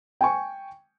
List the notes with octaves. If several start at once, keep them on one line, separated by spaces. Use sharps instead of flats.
G5 G#5 C#6